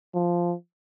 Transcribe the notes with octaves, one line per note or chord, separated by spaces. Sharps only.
F3